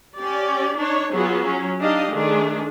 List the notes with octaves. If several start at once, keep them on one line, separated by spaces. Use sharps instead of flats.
C#4 G4 D5
D4 D#4 C#5
F#3 B3 F4 F#4 G#4
F#3 C#4
D4 D#4 G4 D#5 F5
D#3 A3 D4 G#4